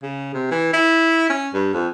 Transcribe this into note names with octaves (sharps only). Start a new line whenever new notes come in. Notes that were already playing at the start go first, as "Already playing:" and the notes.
C#3
C3
E3
E4
C#4
G2
F2